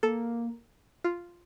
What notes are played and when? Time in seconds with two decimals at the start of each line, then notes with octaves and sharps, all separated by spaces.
0.03 A#3 A4
1.04 F4